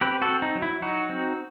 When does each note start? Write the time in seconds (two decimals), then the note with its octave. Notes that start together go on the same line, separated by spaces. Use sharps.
0.01 C4 G4 B4
0.22 F#4 A4
0.29 C4
0.42 D#4
0.55 F#3
0.62 E4
0.82 F#3 D#4 F#4
1.10 C4